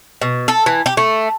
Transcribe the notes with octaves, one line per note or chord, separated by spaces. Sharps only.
B2
A4
E3
G4
A3